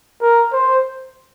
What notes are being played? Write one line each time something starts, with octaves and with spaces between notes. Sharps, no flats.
A#4
C5